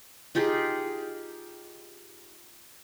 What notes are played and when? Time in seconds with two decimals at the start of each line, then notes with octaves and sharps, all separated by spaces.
0.35 D#4 F4 G4 G#4